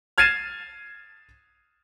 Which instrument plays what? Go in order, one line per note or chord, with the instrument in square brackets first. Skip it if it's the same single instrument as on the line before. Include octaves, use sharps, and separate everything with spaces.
[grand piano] F6 G#6 A6 C7 D#7 E7